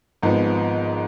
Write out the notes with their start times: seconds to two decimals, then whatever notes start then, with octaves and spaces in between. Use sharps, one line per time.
0.23 G#1 G#2 F3 B3